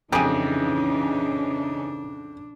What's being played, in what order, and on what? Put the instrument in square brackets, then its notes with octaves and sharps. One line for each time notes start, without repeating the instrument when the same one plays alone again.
[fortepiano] F2 [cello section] C#3 E3 D#4 [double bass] D4 [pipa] G4 G#4